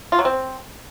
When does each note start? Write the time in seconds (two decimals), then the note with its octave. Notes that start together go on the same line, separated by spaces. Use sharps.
0.12 F4
0.19 F#3
0.25 C4